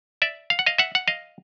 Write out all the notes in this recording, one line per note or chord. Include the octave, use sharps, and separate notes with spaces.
D5 E5
F5
F#5
D#5 F5
E5 F#5
F#5
D#5 F5